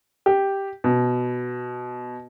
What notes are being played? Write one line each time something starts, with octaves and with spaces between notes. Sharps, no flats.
G4
B2